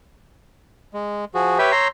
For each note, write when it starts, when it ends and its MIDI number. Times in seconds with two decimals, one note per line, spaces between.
0.94 1.25 56
1.35 1.58 53
1.35 1.58 66
1.35 1.58 68
1.59 1.72 67
1.59 1.72 71
1.59 1.88 73
1.59 1.72 76
1.59 1.88 88
1.59 1.88 91
1.72 1.88 82
1.72 1.88 84